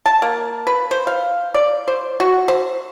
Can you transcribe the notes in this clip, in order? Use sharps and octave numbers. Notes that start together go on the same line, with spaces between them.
A5
A#3
B4
C5
F5
D5
C5
F#4
C5